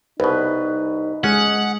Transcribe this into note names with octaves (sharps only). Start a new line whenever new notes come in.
C2 B2 D#4 B4
G#3 C#4 G#4 F#5